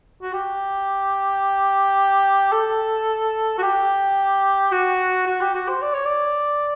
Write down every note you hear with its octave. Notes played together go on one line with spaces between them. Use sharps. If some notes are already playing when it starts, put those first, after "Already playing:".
F#4
G4
A4
F#4
G4
F#4
F#4
G4
F#4
C5
D5
C#5
D5